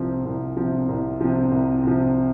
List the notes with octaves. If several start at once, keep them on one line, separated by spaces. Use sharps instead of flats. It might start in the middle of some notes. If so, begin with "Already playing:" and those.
Already playing: C2 C3 F3
C2
C3 F3
C2
C3 F3
C2
C3 F3